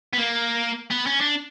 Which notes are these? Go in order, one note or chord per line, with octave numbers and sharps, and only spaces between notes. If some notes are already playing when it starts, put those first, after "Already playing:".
B3
A#3
B3
C#4
D4